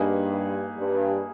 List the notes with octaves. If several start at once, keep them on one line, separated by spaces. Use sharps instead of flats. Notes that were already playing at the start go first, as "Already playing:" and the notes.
Already playing: G2 A#3 D#4 G#4 B4
G2